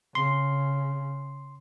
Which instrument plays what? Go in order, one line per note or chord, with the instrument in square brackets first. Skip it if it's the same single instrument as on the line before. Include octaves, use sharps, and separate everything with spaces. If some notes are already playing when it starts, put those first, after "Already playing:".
[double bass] C#3 [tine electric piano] C6